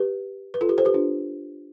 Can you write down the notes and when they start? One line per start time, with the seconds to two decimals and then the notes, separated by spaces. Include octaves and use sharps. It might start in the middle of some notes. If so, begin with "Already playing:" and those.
Already playing: G4 B4
0.54 B4
0.61 F4 A4
0.69 G4 B4
0.78 A4 C5
0.85 G4 B4
0.94 D4 F4